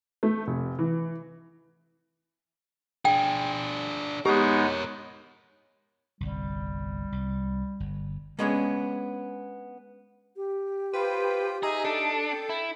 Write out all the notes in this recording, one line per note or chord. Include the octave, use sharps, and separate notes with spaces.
A3
F1
E3
D4 G#4 G5
G#3 B3 D#4 G4 A#4 C#5
G1 C2 G3
C2
G1
G#3 B3 C#4 D4 G#4
G4
F4 B4 C5 G5
D#4 G#4 D#5 E5 A#5
D4 A4
G5
E4